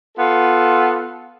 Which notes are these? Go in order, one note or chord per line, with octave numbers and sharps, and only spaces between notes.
B3 F4 A4